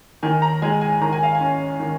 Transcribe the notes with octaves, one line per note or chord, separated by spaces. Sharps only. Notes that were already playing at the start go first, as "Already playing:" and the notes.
D#3 G#5
A#5
G#3 G#5
G#5
D#3 A#5
G#5
F5
G#5
C#4
D#3